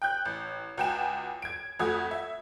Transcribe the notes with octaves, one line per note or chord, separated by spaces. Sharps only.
G5 F#6 G6
A1
C#2 F#4 G5 G#5 E7
G#6 D7
F2 A3 F#4 D#6 G#6
E5